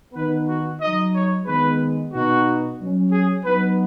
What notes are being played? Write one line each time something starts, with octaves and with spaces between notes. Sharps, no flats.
D#3 B3 D#4 B4
F#4
F#3 D#4 D#5
C#5
D#3 G#3 B3 B4
B2 B3 D#4 F#4
F#3 C#4
G#4
F#3 B3 D#4 B4